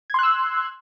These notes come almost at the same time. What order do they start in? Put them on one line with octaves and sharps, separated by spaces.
G#6 C6 F#6 E6